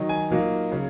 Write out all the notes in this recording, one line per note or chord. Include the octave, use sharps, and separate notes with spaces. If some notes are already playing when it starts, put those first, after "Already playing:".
Already playing: D#3 F#3 D#4
G#5
A#2 F#3 A#3 D#4
C#3 F#3 C#4